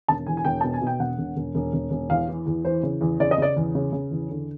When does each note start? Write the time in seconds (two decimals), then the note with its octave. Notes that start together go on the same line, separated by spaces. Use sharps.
0.08 E1 A5
0.26 E2 G#5
0.37 G#5
0.45 E1 G5
0.61 B2 A5
0.74 G#5
0.82 B2
0.87 G5
0.99 E1 F#5
1.18 E1
1.36 E1
1.55 E1
1.73 E1
1.91 E1
2.09 E2 F5
2.28 E3
2.46 E2
2.65 E3 C5
2.83 C#3
3.01 E2
3.20 C#3 D5
3.31 D#5
3.38 C#3 D5
3.56 E2
3.75 C#3
3.93 C#3
4.11 E2
4.30 D3